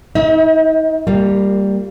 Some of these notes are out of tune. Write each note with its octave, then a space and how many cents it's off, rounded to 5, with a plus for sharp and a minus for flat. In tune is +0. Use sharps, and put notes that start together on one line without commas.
D#4 +35 E5 -35
G3 +5 A#3 -20 F4 +10